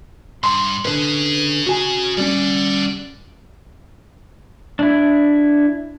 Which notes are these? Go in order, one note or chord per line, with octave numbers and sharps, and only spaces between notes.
G2 C6
D3 C#4 G#4 B4
F#4 G#5
G3 C#4 D5 F#5
D4 E4